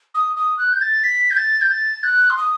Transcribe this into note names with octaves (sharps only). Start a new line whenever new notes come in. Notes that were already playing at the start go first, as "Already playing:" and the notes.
D#6
D#6
F#6
G6
A6
B6
G6
A6
G6
A6
F#6
C6
D#6